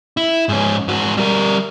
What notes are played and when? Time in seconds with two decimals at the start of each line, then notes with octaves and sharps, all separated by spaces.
0.17 E4
0.49 G#2 C#4
0.88 G#2 F#4
1.17 G3 A#4